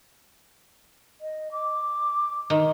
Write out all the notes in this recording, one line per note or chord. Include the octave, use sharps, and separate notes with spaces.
D#5
D6
D#3